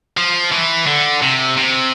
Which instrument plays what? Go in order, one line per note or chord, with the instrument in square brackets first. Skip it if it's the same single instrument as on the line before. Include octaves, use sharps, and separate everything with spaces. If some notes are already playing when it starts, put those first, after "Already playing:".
[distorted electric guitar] F3
E3
D3
C3
C3